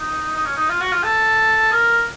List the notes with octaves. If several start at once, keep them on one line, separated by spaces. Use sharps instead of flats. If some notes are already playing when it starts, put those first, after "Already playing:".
Already playing: D#4
D#4
C#4
D#4
F4
F#4
F4
A4
A#4